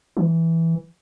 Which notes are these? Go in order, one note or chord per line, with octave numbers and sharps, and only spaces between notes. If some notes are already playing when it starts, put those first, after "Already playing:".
E3